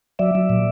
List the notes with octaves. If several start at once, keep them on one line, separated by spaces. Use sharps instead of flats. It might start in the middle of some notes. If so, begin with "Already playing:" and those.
F#3 D5 E5
F#3
A#2